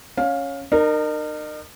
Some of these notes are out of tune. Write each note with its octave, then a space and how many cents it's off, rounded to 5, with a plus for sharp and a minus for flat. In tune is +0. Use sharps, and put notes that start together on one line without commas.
C#4 +0 F5 +20
D#4 -40 A#4 -10